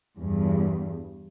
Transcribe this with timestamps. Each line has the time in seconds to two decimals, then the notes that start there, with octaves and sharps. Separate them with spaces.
0.16 E2 G2